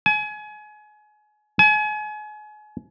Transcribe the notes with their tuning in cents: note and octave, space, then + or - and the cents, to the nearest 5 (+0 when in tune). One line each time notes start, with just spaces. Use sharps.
G#5 +30
G#5 +35